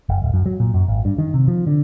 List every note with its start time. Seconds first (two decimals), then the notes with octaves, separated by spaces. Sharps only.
0.09 F#1
0.22 D1
0.34 F#2
0.46 F#3
0.60 A#2
0.74 F#2
0.88 G#1
1.05 G2
1.18 D#3
1.34 C3
1.48 F3
1.67 D3